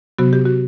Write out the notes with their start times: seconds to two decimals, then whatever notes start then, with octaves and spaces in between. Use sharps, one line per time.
0.18 C3 F#3 B3 F#4
0.33 G4
0.45 F#4